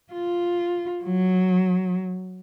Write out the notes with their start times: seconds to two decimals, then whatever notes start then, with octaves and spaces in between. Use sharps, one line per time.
0.13 F4
1.04 F#3